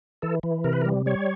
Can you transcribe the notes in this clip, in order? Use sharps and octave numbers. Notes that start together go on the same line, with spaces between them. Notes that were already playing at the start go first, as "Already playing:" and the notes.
E3 A4
E3
C3 A#4
B4
A#4
G3
G3 C#5